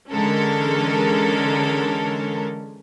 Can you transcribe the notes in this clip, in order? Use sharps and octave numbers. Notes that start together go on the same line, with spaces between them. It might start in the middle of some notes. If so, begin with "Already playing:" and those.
D3 E3 G#3 C#4 A4 A#4